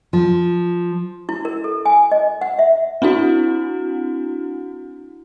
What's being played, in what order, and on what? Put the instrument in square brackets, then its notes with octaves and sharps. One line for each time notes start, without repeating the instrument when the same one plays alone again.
[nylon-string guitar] F3
[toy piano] E4
A#4
A4
G#5
D#5
F#5
E5
[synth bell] C4 D4 E4 F#4